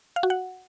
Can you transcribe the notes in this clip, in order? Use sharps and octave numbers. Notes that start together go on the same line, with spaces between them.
F5
F#4
F#5